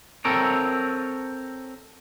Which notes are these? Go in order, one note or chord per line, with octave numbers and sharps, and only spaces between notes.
C4 A4 A#4 C#5